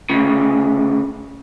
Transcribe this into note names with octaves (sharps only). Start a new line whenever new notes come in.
D2 C#3